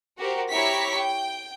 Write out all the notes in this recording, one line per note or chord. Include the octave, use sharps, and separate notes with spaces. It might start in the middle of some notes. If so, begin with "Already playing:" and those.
F#4 G4 A#4 C5
E4 G4 C#5 A#5 C#6 B6
G5